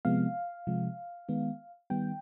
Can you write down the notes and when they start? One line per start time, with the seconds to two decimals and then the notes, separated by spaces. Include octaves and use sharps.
0.05 C3 F3 G#3 B3 F5
0.67 C3 F3 G#3
1.29 D#3 G#3 B3
1.90 D#3 G3 B3 G5